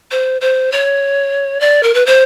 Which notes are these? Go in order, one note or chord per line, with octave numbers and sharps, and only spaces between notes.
C5
C5
C#5
D5
A#4
B4
C5